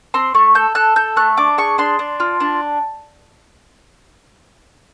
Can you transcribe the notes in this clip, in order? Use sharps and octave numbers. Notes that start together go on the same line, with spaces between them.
C4 C6
A3 C#6
A4 G6
A4 F#6
A4 G6
A3 F#6
D4 D6
G#4 C#6
D4 C6
D4
F4
D4